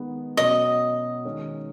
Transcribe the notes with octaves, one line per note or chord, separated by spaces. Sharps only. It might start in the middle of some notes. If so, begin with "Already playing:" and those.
Already playing: D#3 G#3 B3
B2 F#3 C#4 D#5
D#3 G#3 C#4